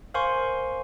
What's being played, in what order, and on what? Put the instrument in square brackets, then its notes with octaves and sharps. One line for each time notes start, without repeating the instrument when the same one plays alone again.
[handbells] A#4 C5 F5 G#5 C6 C#6